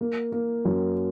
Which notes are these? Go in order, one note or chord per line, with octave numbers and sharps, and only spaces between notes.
A#3
A#3
F#2